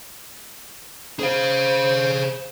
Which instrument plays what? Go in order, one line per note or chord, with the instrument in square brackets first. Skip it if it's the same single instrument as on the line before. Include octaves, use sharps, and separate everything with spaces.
[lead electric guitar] G#4 F5 [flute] C5